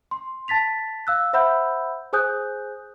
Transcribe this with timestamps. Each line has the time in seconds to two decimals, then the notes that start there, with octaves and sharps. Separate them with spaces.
0.11 C6
0.48 A5 A6 B6 F7
1.07 F5 E6 F#6
1.33 C5 E5 F#5 B5 E6 G6
2.13 G#4 C5 G#5 D#6 F#6 G6